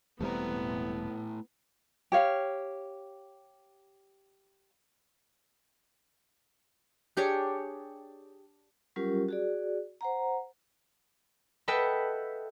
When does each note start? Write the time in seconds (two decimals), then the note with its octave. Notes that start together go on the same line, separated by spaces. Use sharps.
0.21 E1 G3 A3 B3 C4 E4 A#5
2.12 G4 C#5 F5
7.17 D4 G4 G#4 C#5
8.96 F#3 G3 C#4 F4 G4 A#4
9.29 F#4 G#4 D5
10.01 C5 F#5 A#5
11.68 A4 B4 D#5 E5 F#5 G5